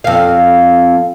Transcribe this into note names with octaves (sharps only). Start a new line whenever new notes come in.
F2 F5